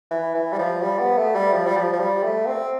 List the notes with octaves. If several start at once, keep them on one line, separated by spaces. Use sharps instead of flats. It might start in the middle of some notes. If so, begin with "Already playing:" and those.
E3
E3
G3
F3
G3
B3
A3
G3
F3
G3
F3
F3
G3
A3
C4